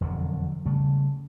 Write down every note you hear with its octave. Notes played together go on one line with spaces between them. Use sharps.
E1 F2 D3 F#3
C#3 G3 A3